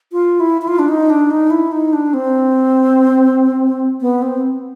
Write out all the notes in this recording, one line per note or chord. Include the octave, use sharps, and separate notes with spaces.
F4
E4
E4
F4
D4
D#4
D4
D#4
E4
D#4
D4
C4
B3
C4